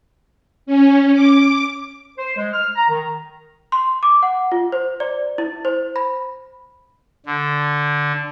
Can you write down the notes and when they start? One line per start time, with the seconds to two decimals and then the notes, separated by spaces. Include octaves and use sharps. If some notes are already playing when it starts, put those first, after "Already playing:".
0.66 C#4
1.14 D6
2.17 C5
2.37 G#3
2.53 F6
2.76 A#5
2.89 D#3
3.72 C6
4.03 D6
4.23 F#5
4.52 F4
4.72 C5
5.00 D5
5.38 E4
5.65 C5
5.96 B5
7.26 D3